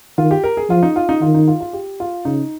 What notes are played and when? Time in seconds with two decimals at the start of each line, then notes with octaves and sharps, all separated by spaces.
0.18 D#3 F4
0.31 G4
0.44 A#4
0.57 G#4
0.69 F3 F4
0.83 D#4
0.96 F4
1.09 D#4
1.22 D#3 F4
1.34 D#4
1.48 F4
1.60 F4
1.73 G4
2.00 F4
2.25 C#3 D#4